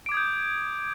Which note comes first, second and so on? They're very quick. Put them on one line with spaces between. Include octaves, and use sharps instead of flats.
D7 D6 G#6 D#6 G6